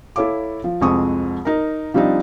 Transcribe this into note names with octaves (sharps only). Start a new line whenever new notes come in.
E4 A4 C#5 F5 D6
F3
C2 F2 G#3 C4 C#6 D#6
D#4 A#4
F3 G3 C4 D4 D#4